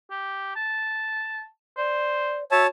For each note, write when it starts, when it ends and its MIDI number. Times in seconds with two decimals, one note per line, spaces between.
0.11 0.53 67
0.56 1.47 81
1.77 2.40 72
1.77 2.44 74
2.51 2.68 66
2.51 2.67 73
2.51 2.63 76
2.51 2.67 81